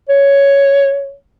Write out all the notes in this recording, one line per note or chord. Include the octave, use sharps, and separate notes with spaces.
C#5